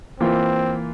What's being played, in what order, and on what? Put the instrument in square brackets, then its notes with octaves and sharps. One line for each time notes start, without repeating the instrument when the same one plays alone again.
[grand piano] E3 A#3 F4 [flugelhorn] C4